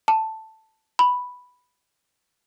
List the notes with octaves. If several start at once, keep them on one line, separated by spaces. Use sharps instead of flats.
A5
B5